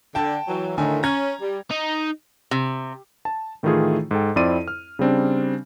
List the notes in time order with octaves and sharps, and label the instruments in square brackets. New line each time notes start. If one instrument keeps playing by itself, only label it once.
[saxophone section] D3 [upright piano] G5 A5
[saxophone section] E3 F#3
[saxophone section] A2 D#3 [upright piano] D3 G#5
[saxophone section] C#4 [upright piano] A#5 G#6
[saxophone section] G3
[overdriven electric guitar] D#4
[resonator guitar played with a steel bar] C3
[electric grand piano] A5
A2 D#3 E3 A3 F4 G#4
G#2 A4 G5
F2 C4 E4 D5 C6 D#7
F6
C#3 G3 C4 D4